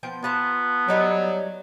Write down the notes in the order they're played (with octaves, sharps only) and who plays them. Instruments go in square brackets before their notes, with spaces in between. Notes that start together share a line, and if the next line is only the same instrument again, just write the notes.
[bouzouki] F3 B3 G5
[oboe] B3 [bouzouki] F4 A5 A#5
[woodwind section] F#3 [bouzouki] G3 D#4 C#5